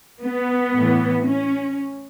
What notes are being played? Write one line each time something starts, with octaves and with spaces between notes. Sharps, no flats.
B3
A2 E3
C#4